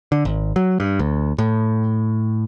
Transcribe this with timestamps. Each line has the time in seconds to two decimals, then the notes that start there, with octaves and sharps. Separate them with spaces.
0.12 D3
0.25 G#1
0.56 F#3
0.80 G2
0.99 D2
1.38 A2